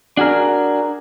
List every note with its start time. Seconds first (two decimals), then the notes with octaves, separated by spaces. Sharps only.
0.17 D4 F#4 G#4 A#4